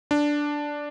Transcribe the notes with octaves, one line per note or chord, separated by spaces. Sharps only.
D4